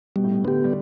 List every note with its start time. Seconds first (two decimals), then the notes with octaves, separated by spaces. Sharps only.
0.16 B2 G3
0.24 A2
0.31 B2
0.45 D3 B3 G4
0.64 G3